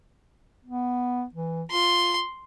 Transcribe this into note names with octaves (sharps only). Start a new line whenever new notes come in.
B3
E3
F4 C6